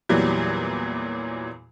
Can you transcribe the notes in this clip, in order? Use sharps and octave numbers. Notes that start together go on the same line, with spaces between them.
E2 A#2 E3 F#3 G3